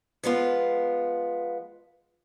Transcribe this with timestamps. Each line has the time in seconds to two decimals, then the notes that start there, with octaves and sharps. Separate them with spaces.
0.23 F3 G#3 B3 F4